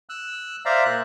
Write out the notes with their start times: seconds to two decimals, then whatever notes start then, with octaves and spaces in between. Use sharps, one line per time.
0.09 E6 F#6
0.65 C5 D5 E5 F5 A#5
0.85 A#2 F#6